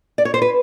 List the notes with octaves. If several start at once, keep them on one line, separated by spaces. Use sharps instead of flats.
D5
C#5
C5
B4